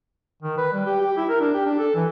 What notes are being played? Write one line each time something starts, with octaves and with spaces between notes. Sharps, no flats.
D#3
B4
G3
G4
G4
E4
A#4
D4
G4
D4
A4
E3